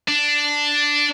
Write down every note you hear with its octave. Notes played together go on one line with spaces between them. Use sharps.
D4